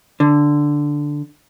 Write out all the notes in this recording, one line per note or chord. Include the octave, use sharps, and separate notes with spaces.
D3